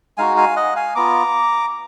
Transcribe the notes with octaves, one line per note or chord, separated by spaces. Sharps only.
G#3 D#4 F#4 F5 G#5
F5 G#5
D#5 F#5
F5 G#5
B3 F4 A#5 D6